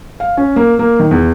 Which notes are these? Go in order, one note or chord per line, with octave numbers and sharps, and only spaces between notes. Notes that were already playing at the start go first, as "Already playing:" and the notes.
F5
C#4
A#3
A#3
D#3
E2